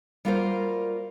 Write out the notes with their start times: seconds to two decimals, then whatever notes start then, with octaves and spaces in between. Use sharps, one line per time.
0.25 G3 A#3 F4 F#4 A#4 C5